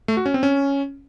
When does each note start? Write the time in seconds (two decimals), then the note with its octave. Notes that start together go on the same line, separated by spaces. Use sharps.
0.08 A3
0.17 F#4
0.26 C#4
0.34 C4
0.43 C#4